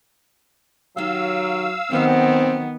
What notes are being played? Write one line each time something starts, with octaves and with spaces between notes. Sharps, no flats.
D#3 F#3 G4 F5 E6
D#3 F#3 B3 C4 G4 F#5